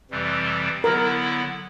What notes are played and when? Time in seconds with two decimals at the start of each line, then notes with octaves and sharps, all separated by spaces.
0.11 F2 C3 E3 G3 C4
0.84 D3 F#3 B3 E4 A#4